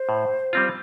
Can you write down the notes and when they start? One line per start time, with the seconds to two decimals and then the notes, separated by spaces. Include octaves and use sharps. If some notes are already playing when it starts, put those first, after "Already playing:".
Already playing: C5
0.09 A2
0.53 G3 C4 F4